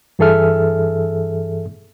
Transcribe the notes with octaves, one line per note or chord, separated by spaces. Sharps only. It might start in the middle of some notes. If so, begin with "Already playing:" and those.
G2 E3 G#4 A4 E5 F6